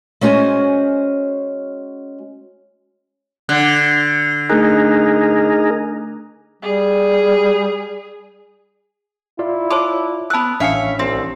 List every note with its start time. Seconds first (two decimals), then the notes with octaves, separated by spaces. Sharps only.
0.21 G#3 C#4 F#4 C5 G#5
3.49 D3 F#6 G#6
4.50 A3 D4 D#4 G#4 A#4 F#6
6.63 G3 G#4
9.39 E4 F4 D5 F5
9.71 C#5 A5 C6 D6
10.30 B3 A5 E6 F#6
10.60 A1 C#4 D4 C#5 E5 F5 G#5 C#7
10.99 C2 C4